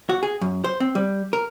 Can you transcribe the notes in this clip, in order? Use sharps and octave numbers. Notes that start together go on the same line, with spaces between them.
F#4
G#4
F#2
C5
C4
G3
A#4